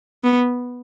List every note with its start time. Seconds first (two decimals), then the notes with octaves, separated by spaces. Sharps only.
0.24 B3